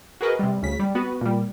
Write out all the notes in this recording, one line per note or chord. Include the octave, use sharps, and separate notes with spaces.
F#4 G#4 A#4 B4 D#5
C3 G3
D2 C#3 B6
G3
B3 F#4 B4
A#2 G3